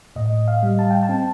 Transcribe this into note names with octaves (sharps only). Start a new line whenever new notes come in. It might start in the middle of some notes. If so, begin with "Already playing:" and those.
A2 D#5
F5
G3
A5
G5
A5
C4